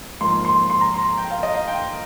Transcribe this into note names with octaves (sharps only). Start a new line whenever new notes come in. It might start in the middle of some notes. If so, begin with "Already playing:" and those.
G#2 F3 A#3 C6
C6
C6
A#5
C6
G5
F5
D#5
F5
G5